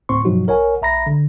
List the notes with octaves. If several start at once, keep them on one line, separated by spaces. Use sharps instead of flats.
D2 A2 C4 C5 C6 C#6
G2 B2 F3 F#3 D#4 F#4
A#1 A#4 C#5 F#5 G#5
B1 E5 A#5 B5 A#6
D3